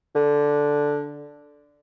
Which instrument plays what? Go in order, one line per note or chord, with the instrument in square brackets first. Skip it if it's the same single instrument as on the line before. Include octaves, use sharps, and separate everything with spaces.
[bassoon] D3